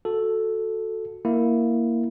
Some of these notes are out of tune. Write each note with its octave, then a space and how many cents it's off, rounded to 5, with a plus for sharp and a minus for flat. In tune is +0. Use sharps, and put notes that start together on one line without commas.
F#4 -15 A4 +0
A#3 +0 E4 +0